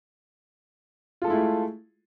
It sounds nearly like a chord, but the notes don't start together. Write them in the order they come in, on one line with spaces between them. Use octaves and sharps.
F4 A4 G#3 E4 A3